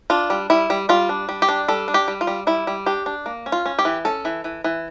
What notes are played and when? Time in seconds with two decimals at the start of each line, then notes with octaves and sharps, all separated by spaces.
0.10 D4 F4
0.30 G3
0.50 G3 E4
0.70 G3
0.89 G3 F4
1.09 D4
1.29 G3
1.42 G4
1.49 D4
1.68 G3 A4
1.88 D4
1.94 G4
2.08 G3
2.21 F4
2.27 G3
2.47 G3 E4
2.67 G3
2.86 D4 G4
3.06 D4
3.26 A#3
3.46 C#4
3.52 F4
3.66 C#4
3.79 G4
3.85 E3
4.05 C#4 A4
4.25 E3
4.44 E3
4.64 E3